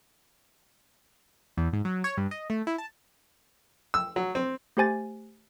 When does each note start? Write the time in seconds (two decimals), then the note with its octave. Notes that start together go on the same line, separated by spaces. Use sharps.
1.57 E2
1.73 G#2
1.85 F#3
2.04 C#5
2.17 G2
2.31 D#5
2.50 A3
2.67 E4
2.78 A5
3.94 E6
4.16 F#3
4.35 C4
4.77 A3 G4 C5 G#5 A6